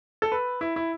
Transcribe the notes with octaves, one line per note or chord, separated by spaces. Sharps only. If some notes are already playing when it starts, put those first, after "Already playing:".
A4
B4
E4
E4